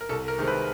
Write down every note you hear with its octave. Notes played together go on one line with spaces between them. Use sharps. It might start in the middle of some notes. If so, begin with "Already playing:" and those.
A#4
C2 A4
A#4
C3 D#3 G#3 C4
B4